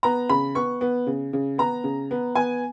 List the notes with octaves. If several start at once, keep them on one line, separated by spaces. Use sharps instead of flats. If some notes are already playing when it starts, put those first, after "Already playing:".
B3 A#5
C#3 B5
B3 C#6
B3
C#3
C#3
B3 A#5
C#3
B3
B3 G#5